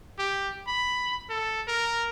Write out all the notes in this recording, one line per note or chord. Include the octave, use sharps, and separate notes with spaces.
G4
B5
A4
A#4